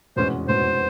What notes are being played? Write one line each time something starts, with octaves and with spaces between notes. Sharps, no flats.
F1 E2 B2 G#3 C#4 C5
F1 E2 B2 G#3 C#4 C5